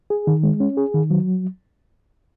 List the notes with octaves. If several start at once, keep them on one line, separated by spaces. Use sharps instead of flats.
G#4
D#3
G#3
C#4
G#4
D#3
F#3